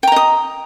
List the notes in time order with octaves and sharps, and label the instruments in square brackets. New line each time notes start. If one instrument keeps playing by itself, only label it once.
[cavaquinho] G5
A#5
D#5
D#6